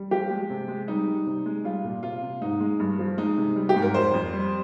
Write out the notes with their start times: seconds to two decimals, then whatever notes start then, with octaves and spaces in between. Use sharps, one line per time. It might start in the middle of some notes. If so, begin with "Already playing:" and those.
Already playing: G3
0.11 F3 G4
0.31 G#3
0.50 C3
0.68 G#3
0.88 G3 D#4
1.07 G3
1.27 C3
1.46 G#3
1.64 G3 F4
1.84 A#2
2.03 C3 F4
2.22 C3
2.41 G#2 D#4
2.60 G#3
2.80 G2
2.99 F3
3.18 G#3 D#4
3.38 C3
3.56 G3
3.69 G4
3.76 G#2
3.82 A#4
3.94 F2 C5
4.14 F2
4.33 G3